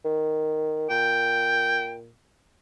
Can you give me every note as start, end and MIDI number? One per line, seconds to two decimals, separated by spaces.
0.05 0.88 51
0.90 2.13 46
0.90 1.95 79